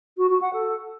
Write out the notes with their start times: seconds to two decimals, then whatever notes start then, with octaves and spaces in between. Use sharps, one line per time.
0.17 F#4
0.29 F#4
0.41 F#5
0.53 A4